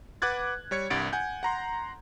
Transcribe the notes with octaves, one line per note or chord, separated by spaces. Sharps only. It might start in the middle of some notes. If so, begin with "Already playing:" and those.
B4 F#5 D6 F#6 G#6 A6
G3 C#5 G#6 C#7
C2 G2 F#5 A6 D7
F#5 G#5 G6
F#5 A#5 C6